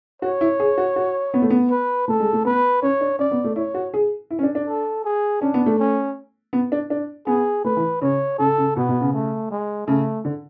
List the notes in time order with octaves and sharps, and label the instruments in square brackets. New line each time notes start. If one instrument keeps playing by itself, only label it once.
[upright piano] F#4 [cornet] C#5
[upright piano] E4
G#4
F#4
F#4
B3
A3
B3
[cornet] B4
[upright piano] A3 [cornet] A4
[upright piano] G#3
A3
[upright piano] B3 [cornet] B4
[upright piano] C#4 [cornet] C#5
[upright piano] D4
[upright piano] C#4 [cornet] D5
[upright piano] B3
A3
[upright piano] E4 [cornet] C#5
[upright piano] F#4
G#4
E4
C#4
D4
D4
[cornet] A4
G#4
[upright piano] C#4 [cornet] D4
[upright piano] B3
A3
[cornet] C#4
[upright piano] B3
D4
D4
[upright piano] B3 [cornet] G#4
[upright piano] A3 [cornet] B4
[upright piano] E3
[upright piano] C#3 [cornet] C#5
[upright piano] C#3 [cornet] A4
[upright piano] C#3
[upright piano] B2 [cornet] B3
[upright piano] B2
C#3
[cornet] A3
G#3
[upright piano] C#3 [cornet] A3
[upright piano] D3